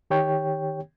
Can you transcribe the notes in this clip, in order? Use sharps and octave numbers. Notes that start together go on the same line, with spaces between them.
D#3 G4 C#5 G5